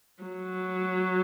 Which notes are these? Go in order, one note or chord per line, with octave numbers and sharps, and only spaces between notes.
F#3